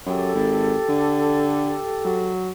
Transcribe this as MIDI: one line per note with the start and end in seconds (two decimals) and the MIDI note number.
0.06 0.32 42
0.06 2.31 67
0.06 2.31 69
0.35 0.76 32
0.89 1.75 50
2.05 2.52 54